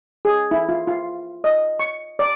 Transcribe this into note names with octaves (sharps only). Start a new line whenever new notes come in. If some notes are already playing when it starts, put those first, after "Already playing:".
G#4
E4
F4
F4
D#5
C#6
D5